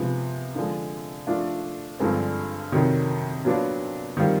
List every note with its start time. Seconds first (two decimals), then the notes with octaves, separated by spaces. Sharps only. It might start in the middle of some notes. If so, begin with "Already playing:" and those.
Already playing: C3 F3 G#3 B3
0.55 D3 F3 G#3
1.27 F3 A3 D4 F4
2.00 G2 D3 F3 G#3 C4
2.72 F2 C3 D#3 F#3
3.45 A#2 F#3 B3 D4 F4
4.17 D#3 G3 C4 F4